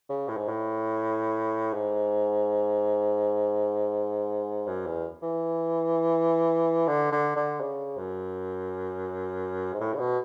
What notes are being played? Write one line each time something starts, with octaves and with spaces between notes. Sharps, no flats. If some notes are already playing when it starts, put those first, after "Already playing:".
C#3
A2
G#2
A2
G#2
F#2
E2
E3
D3
D3
D3
C#3
F#2
G#2
A2
C#3
B2